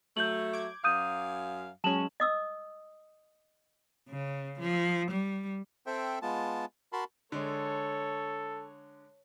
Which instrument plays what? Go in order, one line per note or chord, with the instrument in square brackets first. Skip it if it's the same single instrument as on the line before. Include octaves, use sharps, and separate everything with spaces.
[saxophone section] F#3 A3 [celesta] G6 F#7
[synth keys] D6 G#6
[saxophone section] F#2 F5 [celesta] D#6 G6 D#7
[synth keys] F#3 G#3 C#4 [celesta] A5 E7 F#7
[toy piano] D#5 D#6 E6
[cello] C#3
F3
G3
[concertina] C4 A4 C5 E5 G5
G#3 B3 F4 A5
F#4 A#4 A5 B5 C6
[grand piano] D3 G#3 [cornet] A4 [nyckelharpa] C#5